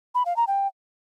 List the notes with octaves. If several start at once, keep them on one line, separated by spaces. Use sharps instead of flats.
B5
F5
A#5
G5